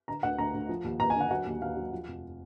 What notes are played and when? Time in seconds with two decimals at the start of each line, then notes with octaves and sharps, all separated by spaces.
0.08 D3 A#5
0.23 D2 F#5
0.39 D2 A#5
0.54 D2
0.69 F3
0.84 D#2
1.00 D#2 A#5
1.10 G#5
1.16 D3
1.21 F#5
1.31 F#3 F#5
1.46 D#2
1.62 D#2 F5
1.77 F#3
1.92 F3
2.08 F1